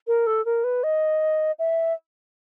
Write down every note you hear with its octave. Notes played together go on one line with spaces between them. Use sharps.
A#4
A4
A#4
B4
D#5
E5